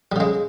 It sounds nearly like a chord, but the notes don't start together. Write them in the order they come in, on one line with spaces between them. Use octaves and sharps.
G3 C#3 G#3